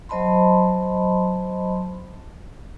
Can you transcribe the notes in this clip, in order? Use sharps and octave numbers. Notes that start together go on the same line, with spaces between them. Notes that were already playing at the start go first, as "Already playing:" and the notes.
F#3 C5 D#5 A5 B5 C6